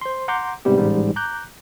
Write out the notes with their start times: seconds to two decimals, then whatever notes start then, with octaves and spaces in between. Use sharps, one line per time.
0.01 C5 C6
0.28 F#5 A#5 C6 D6 G6
0.65 G#2 C3 G3 B3 G4
0.78 A1 G#2 G3
1.16 A#5 D6 F#6 G6